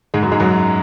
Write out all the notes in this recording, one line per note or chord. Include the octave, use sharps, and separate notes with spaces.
G#2 G#3
F#2 F#3
G#2 G#3
F#2 F#3